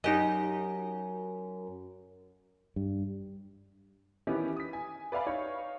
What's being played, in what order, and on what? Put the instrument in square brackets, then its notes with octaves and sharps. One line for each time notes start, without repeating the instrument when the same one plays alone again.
[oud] F#2 [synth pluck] D#4 G4 D#5
[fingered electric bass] G2
[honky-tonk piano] D#3 E3 B3 C#4 E4 G4
D#6 B6
G#5
B4 D5 E5 F5 G#5 B5
D#4 C#5 F5 C#6